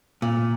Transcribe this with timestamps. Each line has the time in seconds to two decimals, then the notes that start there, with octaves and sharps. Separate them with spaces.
0.22 A#2